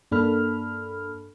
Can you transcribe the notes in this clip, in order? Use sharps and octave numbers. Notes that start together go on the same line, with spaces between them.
G2 A#3 D4 A4 B5 F6